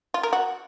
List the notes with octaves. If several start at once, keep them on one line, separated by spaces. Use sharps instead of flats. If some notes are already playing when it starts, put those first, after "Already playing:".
F4
A#4
F#4